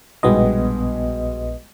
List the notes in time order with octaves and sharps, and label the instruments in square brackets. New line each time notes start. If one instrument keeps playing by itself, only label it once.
[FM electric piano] A#1 B3 D#5 [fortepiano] G2 B2 G#3